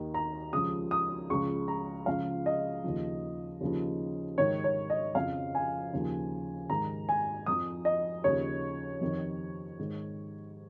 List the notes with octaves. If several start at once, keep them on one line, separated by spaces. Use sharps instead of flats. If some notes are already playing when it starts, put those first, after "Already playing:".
Already playing: D#2 D#3
A#5
C#2 C#3 F3 D#6
D#6
C#2 C#3 F3 C#6
A#5
C#2 C#3 F3 F5
D#5
D#2 C#3 F3
D#2 C#3 F3
G#2 D#3 C#5
C#5
D#5
F2 C#3 F3 F5
G#5
D#2 C#3 F3
G#2 D#3 A#5
G#5
F2 F3 D#6
D#5
D#2 C#3 F3 C#5
F2 D#3
G#2 D#3